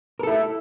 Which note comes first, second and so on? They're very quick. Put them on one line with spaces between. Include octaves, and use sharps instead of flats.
A#4 A4 E4